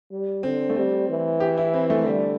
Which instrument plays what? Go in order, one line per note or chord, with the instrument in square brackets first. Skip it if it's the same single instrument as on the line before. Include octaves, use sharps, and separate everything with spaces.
[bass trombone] G3
[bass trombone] D3 [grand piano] C4
[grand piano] A3
[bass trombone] G3 [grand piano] C4
[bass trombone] E3
[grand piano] G4
E4
C4
A3
[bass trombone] D3 [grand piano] G3